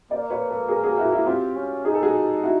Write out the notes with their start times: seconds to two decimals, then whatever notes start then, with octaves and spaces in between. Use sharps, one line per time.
0.10 A#3 C5 D5
0.30 B4 C#5
0.49 A4 B4
0.68 G#4 A#4
0.83 F#4 G#4
0.98 E4 F#4
1.12 E4 F#4
1.27 C4 F4 G4
1.56 C#4
1.85 D#4 G#4
1.94 A4
2.03 F#4 G#4
2.43 E4 F#4